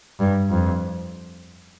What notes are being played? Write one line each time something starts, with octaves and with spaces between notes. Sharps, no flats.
G2
F2